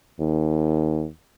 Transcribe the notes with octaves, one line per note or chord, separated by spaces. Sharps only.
D#2